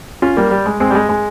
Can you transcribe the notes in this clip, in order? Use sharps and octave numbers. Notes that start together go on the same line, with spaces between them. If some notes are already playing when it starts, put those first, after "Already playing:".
C#4 F4
G3 A#3
G3
G#3
G#3 C4
G3
G#3
G#3